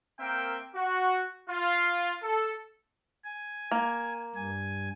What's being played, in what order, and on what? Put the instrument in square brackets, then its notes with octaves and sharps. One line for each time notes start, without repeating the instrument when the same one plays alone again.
[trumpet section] A#3 C4 A#4 E5 G5
F#4
F4
A4
[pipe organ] G#5
[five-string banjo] A#3
[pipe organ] G2 G#5